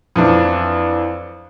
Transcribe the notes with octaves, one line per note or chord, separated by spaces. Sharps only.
F2 E3 D4